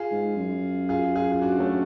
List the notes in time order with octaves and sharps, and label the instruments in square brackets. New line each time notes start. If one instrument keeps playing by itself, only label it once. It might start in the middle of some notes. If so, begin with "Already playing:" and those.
Already playing: [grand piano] F4 G#4
[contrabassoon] G#2
F#2
[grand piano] F4 G#4
F4 G#4
G#4
D4 F#4
A3 C#4